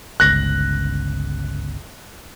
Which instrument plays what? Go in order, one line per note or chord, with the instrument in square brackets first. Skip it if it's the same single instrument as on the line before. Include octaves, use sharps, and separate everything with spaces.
[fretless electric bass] G1 C#2 [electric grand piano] F#6 A#6